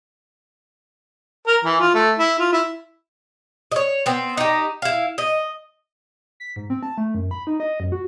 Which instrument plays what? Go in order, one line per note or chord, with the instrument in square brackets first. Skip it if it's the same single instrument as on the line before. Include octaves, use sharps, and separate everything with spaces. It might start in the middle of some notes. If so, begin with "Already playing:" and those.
[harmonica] A#4
E3
F4
A3
E4
F4
E4
[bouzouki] C#5 D#5
B3 C4
D#4 G4
E4 F5
D#5
[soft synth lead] B6
G#2
C4
A5
A3
F#2
B5
D#4
D#5
F#2
F#4